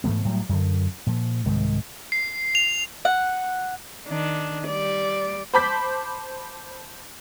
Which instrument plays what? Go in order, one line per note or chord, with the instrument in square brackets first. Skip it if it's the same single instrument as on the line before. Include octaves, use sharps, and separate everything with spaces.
[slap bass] G#2 E3 A3 B3
A2 F#3 G3
F#2 D3
A#2 F3
C2 G#2 D#3 G#3
[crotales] C7
F7
[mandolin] F#5
[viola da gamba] D#3 D4
G3 D5
[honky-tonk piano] C5 A5 B5 D6 G6 B6